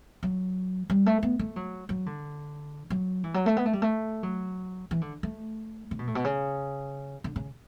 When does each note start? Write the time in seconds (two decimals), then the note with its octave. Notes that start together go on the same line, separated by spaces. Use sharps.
0.23 F#3
0.90 G3
1.06 A3
1.23 B3
1.39 A3
1.56 F#3
1.89 F#3
2.06 D3
2.90 F#3
3.24 E3
3.34 F#3
3.46 A3
3.57 B3
3.66 A3
3.73 G3
3.82 A3
4.23 F#3
4.91 E3
5.01 D3
5.23 A3
5.91 D3
5.99 B2
6.07 A2
6.15 B2
6.24 C#3
7.24 D3
7.36 C#3